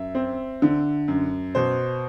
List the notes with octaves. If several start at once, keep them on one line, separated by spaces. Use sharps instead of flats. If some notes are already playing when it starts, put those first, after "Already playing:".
Already playing: F#2 E5
C4
D3
F#2
B2 C5